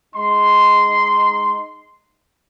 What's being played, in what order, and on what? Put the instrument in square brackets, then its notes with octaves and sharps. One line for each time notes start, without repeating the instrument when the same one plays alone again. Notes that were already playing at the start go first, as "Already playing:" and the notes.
[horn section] G#3 D#4 C6